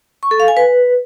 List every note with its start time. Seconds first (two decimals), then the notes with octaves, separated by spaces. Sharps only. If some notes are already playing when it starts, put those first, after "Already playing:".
0.23 C#6
0.31 A4
0.40 F5
0.48 G#5
0.57 B4